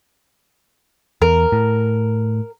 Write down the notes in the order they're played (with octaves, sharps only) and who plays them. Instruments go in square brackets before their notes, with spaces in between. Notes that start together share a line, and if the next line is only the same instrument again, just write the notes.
[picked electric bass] E2 [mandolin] A#4
[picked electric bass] A2